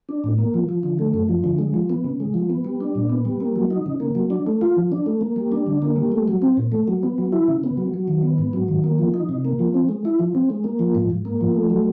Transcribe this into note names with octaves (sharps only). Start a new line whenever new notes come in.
D4
A2
A#3
F3
F3
D3
A3
F#2
F3
D3
G#3
F3
B3
C#3
G#3
F3
B3
G3
D4
A#2
B3
G3
A#3
F#3
D#4
C#3
A#3
F#3
D4
A3
F4
F3
D4
A3
A#3
G3
D4
D3
A#3
G3
A3
F#3
C4
A#2
A3
F#3
B3
F#3
E4
C#3
B3
F#3
F#3
D#3
B3
G#2
F#3
D#3
A#3
F3
D#4
C3
A#3
F3
C4
G#3
E4
F3
C4
G#3
A#3
F3
G#2
G#2
A#3
F3
A3
F#3